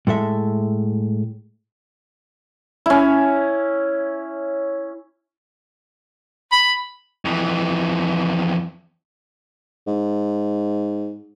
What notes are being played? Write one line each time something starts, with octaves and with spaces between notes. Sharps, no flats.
A2 G#3 A4 E5
C#4 E4
B5
F2 E3
G#2